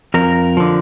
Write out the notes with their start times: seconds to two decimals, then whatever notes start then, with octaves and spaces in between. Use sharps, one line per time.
0.14 F2 A#4
0.57 D3 F3